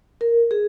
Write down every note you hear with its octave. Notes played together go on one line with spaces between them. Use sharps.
A#4
G#4